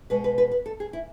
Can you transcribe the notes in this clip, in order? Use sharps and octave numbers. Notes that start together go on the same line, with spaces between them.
B2 G#3 B4
B4
B4
B4
A4
G#4
E4